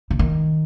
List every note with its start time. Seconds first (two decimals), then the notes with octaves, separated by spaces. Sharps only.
0.10 D3
0.19 D#3